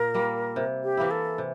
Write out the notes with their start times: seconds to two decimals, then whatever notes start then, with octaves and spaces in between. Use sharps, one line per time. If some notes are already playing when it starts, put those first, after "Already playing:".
Already playing: A#2 A#4
0.15 G3 A#3
0.56 C3
0.84 G4
0.97 E3 A#3 E4
1.11 A4
1.38 C3